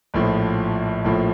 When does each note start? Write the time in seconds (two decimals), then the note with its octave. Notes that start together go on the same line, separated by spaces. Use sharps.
0.14 A#1 A2 F3
1.04 A#1 A2 F3